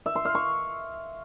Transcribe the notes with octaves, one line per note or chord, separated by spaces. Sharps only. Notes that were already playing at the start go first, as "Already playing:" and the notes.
E5
C6
F5
C#6